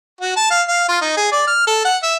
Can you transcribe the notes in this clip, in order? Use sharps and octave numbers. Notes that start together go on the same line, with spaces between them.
F#4
A5
F5
F5
F4
D#4
G#4
D5
F6
A4
F#5
E5